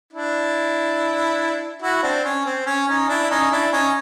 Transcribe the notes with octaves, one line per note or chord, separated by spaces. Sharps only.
D4 E4
E4 F#4
C4 D4
C#4
C4
C#4
C#4 D#4
D4 E4
E4
C#4 D#4
D4 E4
C#4 D#4